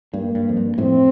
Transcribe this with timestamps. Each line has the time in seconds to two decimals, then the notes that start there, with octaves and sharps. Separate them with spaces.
0.13 G2 A#3
0.35 G2
0.49 F2
0.57 G2
0.78 F2 A2 C4